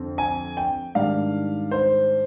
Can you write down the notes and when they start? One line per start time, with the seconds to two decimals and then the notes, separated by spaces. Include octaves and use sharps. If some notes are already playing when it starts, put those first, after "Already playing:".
Already playing: F2 D3 C4
0.18 G#5
0.57 G5
0.95 G#2 D#3 G3 D4 F5
1.71 C5